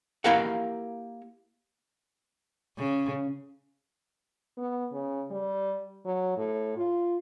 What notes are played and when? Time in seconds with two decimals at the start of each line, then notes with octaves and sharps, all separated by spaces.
0.24 A#3 E4 G4 A#4 F5 F#5
2.78 C#3
4.58 B3
4.93 C#3
5.31 G3
6.05 F#3
6.37 A2
6.77 F4